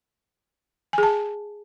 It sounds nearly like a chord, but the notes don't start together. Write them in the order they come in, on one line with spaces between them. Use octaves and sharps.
G#5 G#4 A5